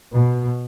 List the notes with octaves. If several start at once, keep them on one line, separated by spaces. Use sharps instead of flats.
B2